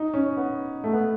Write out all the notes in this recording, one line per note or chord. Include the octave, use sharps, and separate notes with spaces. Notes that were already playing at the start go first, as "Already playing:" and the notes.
Already playing: D#4
C#4
B3
A3
B3